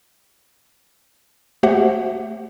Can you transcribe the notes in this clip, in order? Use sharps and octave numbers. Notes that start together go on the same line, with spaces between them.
A3 F#4 G4 C5 E5 F#5